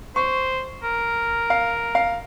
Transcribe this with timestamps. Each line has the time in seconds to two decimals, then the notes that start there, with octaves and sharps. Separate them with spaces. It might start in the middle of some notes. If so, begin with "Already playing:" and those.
0.16 C5 C#6
0.83 A#4
1.50 F5
1.95 F5